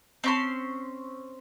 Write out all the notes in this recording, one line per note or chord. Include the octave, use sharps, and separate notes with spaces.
C4 C#4 C6